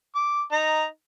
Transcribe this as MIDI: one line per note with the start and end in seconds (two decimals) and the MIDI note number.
0.15 0.42 86
0.52 0.85 63
0.52 0.85 82